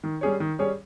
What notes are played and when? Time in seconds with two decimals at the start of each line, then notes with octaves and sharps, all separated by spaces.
0.04 D#3
0.21 G3 C#4 G#4 C#5
0.40 D#3
0.59 G3 C#4 G#4 C#5